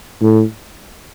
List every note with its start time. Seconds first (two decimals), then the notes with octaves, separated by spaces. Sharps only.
0.22 A2